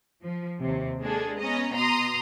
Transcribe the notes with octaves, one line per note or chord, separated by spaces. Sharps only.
F3
D#2 C3
G#3 A#3 D4 G#4 A4
B3 C#4 D#5 A#5
B2 A#5 C6 D#6